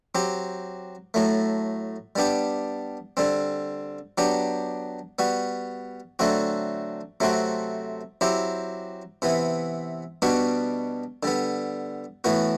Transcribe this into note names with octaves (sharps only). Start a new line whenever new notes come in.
F#3 C4 G4
A2 F#3 A3
G3 B3 D4 G4
D3 G3 C4
F#3 B3 D4 G4
G3 B3 F#4
D3 F#3 A3 C4 F#4
C3 F#3 A3 C4 F#4
F#3 C4 E4 G4
C3 E3 B3
B2 G3 B3 D4 F#4
D3 G3 B3
A2 E3 B3 F#4